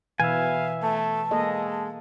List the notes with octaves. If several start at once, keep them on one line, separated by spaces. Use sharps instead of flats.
B2 E3 B4 E5 F5 G#5
A3 A5
G#3 A#3 A4 D#5